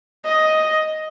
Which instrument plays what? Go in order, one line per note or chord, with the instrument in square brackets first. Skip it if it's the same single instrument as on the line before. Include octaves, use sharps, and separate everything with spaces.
[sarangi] D#5